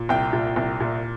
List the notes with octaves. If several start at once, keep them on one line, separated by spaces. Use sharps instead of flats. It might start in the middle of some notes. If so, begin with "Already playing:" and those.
Already playing: A#2
C2 G5
A#2
C2
A#2